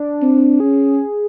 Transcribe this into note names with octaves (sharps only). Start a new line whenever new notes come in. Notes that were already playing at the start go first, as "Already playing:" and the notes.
Already playing: D4
C4
C#4 G#4